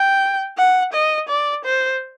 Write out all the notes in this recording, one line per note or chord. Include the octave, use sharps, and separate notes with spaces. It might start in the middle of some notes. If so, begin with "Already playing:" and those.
Already playing: G5
F#5
D#5
D5
C5